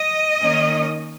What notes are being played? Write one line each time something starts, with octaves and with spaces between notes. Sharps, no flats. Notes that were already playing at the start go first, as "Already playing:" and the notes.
Already playing: D#5
D#3 A#3 C#4